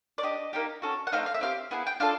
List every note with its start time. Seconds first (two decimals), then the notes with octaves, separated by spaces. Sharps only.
0.18 D5
0.23 D4 G4 D#5
0.53 A#3 D#4 G4
0.82 C#4 F#4 A4
1.07 F#5
1.12 A3 C4 D#4 F5
1.26 F5
1.34 E5
1.41 C4 D#4 G4 F5
1.71 B3 E4 G#4
1.87 G5
2.00 D4 F4 A4 F5